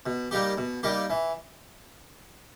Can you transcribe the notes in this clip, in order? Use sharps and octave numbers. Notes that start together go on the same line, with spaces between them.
B2
G3 A#3 D#4 G4
B2
G3 A#3 D#4 G4
E3